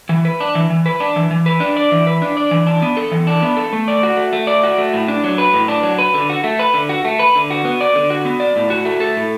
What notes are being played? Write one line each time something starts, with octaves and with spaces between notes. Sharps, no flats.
E3
B4
D4
E3
E3
B4
D4
E3
E3
B4
D4
D5
E3
B4
D4
D5
E3
D4
B3
A4
E3
D4
B3
A4
A3
D5
F#4
A3
A3
D5
F#4
A3
A2
D4
F#3
B4
A2
D4
F#3
B4
D3
F#4
A3
B4
D3
F#4
A3
B4
D3
F#4
B3
D5
D3
F#4
B3
D5
A2
F#4
A3
A4
A2